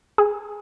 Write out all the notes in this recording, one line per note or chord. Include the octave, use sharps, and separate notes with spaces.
G#4